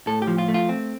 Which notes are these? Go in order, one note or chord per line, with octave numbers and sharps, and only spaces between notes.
A2 A4
G4
F3
F4
A3
F4
C4